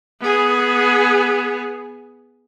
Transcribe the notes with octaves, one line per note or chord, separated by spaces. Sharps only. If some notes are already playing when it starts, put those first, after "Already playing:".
B3 G#4